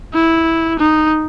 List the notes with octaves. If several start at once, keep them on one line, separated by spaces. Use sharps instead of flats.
E4
D#4